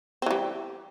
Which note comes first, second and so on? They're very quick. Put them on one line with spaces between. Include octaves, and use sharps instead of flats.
C4 E3 G3